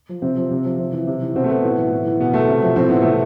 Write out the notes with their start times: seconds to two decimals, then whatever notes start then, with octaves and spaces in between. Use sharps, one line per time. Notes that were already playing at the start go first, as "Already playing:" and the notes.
0.09 F3
0.22 C3 C4
0.37 F3
0.51 C3
0.65 F3
0.79 C3
0.93 E3
1.07 C3
1.22 E3
1.35 B2 C4
1.44 A3
1.50 B2 B3
1.64 A2
1.78 E3
1.91 A2
2.06 E3
2.20 B2 B3
2.34 B2 A3
2.49 C3
2.63 F3
2.76 A2 C4
2.89 E3 B3
3.01 C3 A3